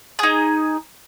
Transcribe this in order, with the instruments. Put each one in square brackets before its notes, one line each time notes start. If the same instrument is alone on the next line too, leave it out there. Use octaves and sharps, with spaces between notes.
[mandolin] D#4 G#4